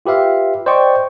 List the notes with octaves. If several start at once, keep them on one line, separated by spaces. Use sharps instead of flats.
F4 G4 B4 E5 F5
C5 D5 D#5 G5 C#6